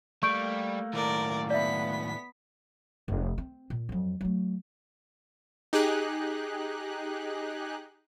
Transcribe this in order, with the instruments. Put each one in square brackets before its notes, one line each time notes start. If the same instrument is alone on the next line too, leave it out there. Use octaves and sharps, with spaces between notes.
[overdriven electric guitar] G3 [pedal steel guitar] A3 A#3 [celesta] C#6 G6 D7
[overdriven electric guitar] D#2 A2 [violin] A#4 D5
[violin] B3 B6 [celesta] D5 E5
[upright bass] F1
C4
A#2
F2 F#3
F#3 A3
[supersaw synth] D#4 G4 G#4 F#6